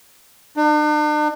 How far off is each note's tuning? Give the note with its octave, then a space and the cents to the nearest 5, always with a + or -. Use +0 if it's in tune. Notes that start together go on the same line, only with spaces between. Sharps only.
D4 +45